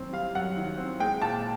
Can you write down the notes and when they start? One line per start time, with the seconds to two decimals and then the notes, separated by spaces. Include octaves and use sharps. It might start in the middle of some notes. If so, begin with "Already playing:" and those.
Already playing: F#2 D#3 C4
0.12 G3 F5
0.35 F#2 F#5
0.57 D#3
0.77 C4
1.00 G#3 G5
1.22 A#2 A5